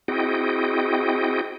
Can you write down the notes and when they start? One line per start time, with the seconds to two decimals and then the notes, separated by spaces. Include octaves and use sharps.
0.08 C4 E4 F#4 G#4 D#5 G5